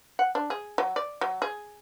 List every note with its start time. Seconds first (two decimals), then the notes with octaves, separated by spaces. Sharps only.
0.19 F#5
0.35 D4
0.50 G#4
0.78 F#3
0.96 D5
1.21 F#3
1.42 G#4